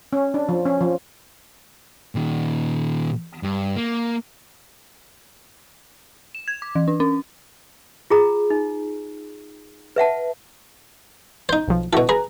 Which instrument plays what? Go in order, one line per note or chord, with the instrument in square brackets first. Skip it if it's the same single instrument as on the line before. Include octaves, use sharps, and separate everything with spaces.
[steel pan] C#4
D4
F3
C#4
F3
[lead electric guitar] A#2 D#3
G2
A#3
[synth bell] E7
G#6
D6
E3
D4
C#4
[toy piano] F4 G#4 A#5
D#4
B4 E5 F#5 A5
[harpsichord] D#4 C5 [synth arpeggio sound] G6
[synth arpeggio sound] B1 F3
[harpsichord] B2 A4 [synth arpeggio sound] E4 F#4
[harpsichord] G#4 [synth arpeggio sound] B4 A#5